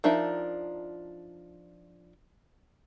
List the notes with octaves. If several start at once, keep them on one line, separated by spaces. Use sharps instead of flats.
F3 D4 D#4 A#4 E5